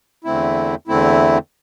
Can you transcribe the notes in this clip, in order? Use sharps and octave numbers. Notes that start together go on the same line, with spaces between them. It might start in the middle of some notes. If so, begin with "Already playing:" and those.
E2 D3 A3 C4 E4
E2 D3 A3 C4 E4